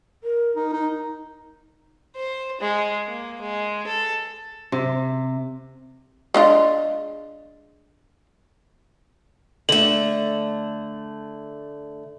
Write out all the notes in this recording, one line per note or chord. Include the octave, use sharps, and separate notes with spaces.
A#4
D#4
D#4
C5
G#3
A#3
G#3
A4
C3
G#3 D4 F4
D3 A3 F#7